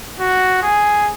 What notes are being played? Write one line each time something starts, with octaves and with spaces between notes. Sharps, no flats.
F#4
G#4